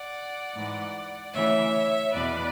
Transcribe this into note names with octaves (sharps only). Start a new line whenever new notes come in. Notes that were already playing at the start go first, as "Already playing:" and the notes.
Already playing: D5 F#5
G#2 E3
D2 C#3 E3 C#5 E5
E2 B2 B4 D5